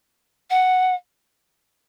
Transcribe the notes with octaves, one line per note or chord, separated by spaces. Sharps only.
F#5